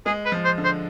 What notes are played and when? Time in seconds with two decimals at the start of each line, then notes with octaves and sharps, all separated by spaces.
0.06 G#3 G#4
0.26 B4
0.32 F3
0.45 C5
0.58 D3
0.64 C5